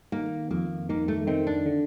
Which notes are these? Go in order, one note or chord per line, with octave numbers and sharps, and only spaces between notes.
D#3 A#3
F2 A#3
D#3 A#3
A3
D#3 C4
D4
D3